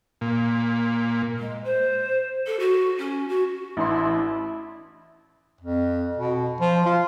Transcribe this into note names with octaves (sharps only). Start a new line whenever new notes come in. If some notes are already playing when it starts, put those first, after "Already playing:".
A#2
G#3
C5
A4
F#4
C#4
F#4
A1 D4 E4 C6
F2
B2
F3
F4